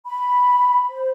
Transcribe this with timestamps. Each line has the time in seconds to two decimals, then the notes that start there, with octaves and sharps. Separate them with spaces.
0.06 B5
0.89 C5